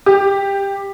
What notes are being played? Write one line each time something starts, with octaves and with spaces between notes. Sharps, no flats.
G4